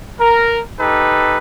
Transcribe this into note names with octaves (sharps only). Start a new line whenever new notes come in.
A#4
D#4 G4 A4 B4